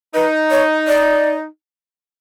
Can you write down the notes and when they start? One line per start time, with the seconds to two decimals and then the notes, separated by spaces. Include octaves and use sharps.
0.14 D#4 B4
0.51 C#5
0.87 D5